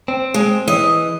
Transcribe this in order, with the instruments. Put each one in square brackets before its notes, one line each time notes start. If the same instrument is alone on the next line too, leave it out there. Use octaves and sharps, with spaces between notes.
[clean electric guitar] C4
[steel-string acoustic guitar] G#3
[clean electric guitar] E3 [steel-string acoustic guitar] D#5